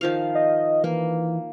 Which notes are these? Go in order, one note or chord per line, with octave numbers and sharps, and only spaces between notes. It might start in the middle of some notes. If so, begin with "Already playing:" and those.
D#3 F3 F5
D#5
E3 A#3